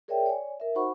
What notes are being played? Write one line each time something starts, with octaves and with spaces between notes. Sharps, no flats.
G#4 A#4 C#5 D5 E5 G5
C#5 D5 G#5
A#4 E5
D#4 F#4 C5 F#5 B5 C#6